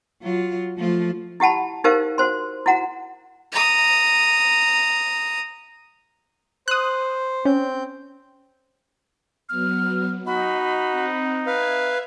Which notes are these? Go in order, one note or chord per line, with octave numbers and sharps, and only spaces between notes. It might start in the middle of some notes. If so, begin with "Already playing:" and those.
F#3 F4
F3 A3 F4
E4 G4 F#5 A5 B5
D#4 G4 A#4 C5 F5
F#4 C5 C6
E4 F#4 F#5 A#5
A#5 D#6
C5 D#6 F#6
C4 C#4 G6
F#3 B3 F6
D#4 F#4 D#5 B5
C4 F#5
B4 E5 F5 G#6